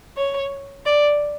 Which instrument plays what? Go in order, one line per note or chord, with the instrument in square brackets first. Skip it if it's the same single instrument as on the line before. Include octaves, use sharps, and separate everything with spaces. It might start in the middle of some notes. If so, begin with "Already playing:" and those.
[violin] C#5
D5